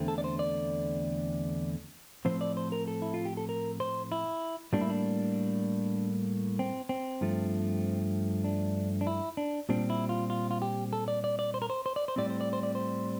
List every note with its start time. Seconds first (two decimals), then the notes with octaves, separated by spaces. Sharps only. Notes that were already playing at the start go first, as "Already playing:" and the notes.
Already playing: E2 D3 A3 C4
0.08 A4
0.18 D5
0.24 C5
0.39 D5
2.25 A2 F3 C4 C5
2.41 D5
2.57 C5
2.72 A#4
2.87 A4
3.02 E4
3.14 F4
3.25 G4
3.37 A4
3.49 A#4
3.80 C5
4.12 E4
4.73 A2 G3 A#3 D4
4.81 E4
4.90 D4
6.59 C4
6.89 C4
7.21 G2 F3 A3
8.44 D4
9.01 D4
9.07 E4
9.37 D4
9.69 A#2 G3 C4 D4
9.90 E4
10.09 F4
10.30 F4
10.51 F4
10.62 G4
10.93 A4
11.08 D5
11.24 D5
11.39 D5
11.54 C5
11.62 A#4
11.70 C5
11.86 C5
11.96 D5
12.08 C5
12.16 A2 G3 C4 D5
12.30 C5
12.41 D5
12.53 C5
12.63 D5
12.75 C5